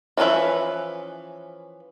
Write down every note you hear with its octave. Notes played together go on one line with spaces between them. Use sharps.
E3 F3 C#4 B4 E5